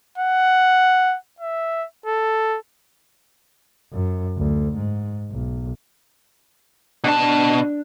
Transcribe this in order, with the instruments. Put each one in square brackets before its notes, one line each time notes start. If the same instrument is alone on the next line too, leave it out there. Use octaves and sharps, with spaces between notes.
[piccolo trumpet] F#5
E5
A4
[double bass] F#2
D2
G#2
B1
[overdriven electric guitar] B2 A5 [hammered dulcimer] D4